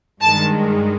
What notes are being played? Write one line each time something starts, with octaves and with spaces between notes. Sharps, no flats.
G2 D#3 G#3 A5